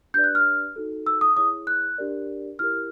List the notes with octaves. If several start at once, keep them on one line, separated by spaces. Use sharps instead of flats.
D4 G4 B4 D5 G6
F#6
F6
D#4 F#4 A4
E6
D#6
E4 G#4 C#5 D#6
F#6
D4 G4 A#4 D5
E4 G4 A#4 F6